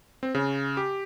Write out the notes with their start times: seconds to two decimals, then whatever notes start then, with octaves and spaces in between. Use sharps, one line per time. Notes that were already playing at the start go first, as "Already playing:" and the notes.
0.23 C4
0.35 C#3
0.77 G4